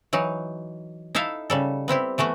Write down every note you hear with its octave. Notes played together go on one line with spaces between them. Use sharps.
E3 F#3 D#4
D#4 E4 A4 E5 F5
C#3 G3 A4
B3 C4 E4 G4
E3 A3 B3 F#4